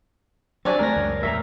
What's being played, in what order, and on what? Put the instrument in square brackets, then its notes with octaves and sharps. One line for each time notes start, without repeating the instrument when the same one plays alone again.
[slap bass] F#3 [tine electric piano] C4 D4 G4 [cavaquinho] C#5 D5 G#5
[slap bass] D2 G#3 A3 [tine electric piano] A#4 A#6
[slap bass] C#2 F#2 G#3
[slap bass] E2 A2 B3 [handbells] A#4 [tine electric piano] E5 A#5